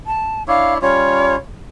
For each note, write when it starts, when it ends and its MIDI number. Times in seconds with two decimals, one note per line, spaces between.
0.07 0.43 81
0.48 0.78 62
0.48 0.78 64
0.48 0.78 73
0.48 0.74 77
0.82 1.36 55
0.82 1.36 61
0.82 1.36 65
0.82 1.34 73